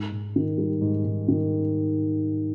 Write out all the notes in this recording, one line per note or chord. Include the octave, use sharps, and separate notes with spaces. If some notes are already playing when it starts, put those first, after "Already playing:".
Already playing: G#2
G#2
D#3
G3
G#2
G#2
D#3